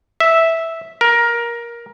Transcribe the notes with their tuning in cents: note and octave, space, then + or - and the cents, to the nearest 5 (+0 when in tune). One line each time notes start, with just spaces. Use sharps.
E5 -5
A#4 +15